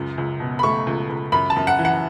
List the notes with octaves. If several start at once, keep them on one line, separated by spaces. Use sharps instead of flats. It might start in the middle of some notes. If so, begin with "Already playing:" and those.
Already playing: C#2 F#2
C#2
B2
B5
A3 C#6
C#2
C#2
F#2 B5
A5
F#2
F#5
E3
F#5